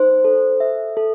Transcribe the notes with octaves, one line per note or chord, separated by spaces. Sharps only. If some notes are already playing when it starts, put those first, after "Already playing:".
Already playing: D#4 C5
A4
E5
A4